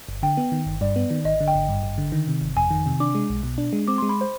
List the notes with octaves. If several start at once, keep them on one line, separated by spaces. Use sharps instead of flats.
G1
D3 G5
B3
D#3
G1
G2 D5
B3
D#3
G#1 D#5
D3
G5
G#1
G2
G#1
D3
D#3
C3
G1
F2 G#5
D#3
C3
D4 D6
G#3
B1
B2
D4
G#3
C4 D6
C6
G#3
B5
C5